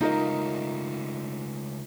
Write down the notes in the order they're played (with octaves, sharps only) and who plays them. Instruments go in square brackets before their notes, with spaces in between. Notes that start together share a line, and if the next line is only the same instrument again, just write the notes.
[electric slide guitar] C#3 G#3 A3 [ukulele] D#4 A#4 D#5 [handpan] F4